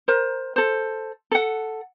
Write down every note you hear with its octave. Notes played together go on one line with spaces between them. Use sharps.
A#4 C5
A4 C5
A4 F#5